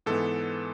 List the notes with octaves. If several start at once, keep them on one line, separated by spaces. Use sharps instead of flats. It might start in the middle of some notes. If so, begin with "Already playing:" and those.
G#2 E3 G#3 B3 A4